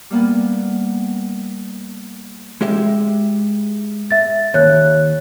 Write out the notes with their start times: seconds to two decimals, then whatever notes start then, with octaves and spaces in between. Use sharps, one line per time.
0.10 G3 A#3 B3
2.61 G#3 G4 E5
4.11 E5 A6
4.54 D#2 C#5 F#6